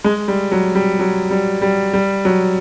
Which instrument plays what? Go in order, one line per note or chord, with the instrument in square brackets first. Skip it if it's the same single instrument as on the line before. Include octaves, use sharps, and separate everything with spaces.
[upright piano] G#3
G3
F#3
G3
F#3
G3
G3
G3
F#3